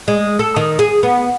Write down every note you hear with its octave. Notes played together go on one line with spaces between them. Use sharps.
G#3
A4
D#3
G#4
B3